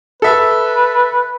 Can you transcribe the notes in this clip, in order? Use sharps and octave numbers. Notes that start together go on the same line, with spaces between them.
A4 B4 E5